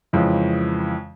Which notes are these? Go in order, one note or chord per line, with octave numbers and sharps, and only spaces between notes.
F2 C#3 E3 G#3